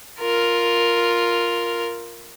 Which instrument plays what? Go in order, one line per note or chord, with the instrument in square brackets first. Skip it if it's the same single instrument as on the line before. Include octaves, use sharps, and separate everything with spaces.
[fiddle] F4 A#4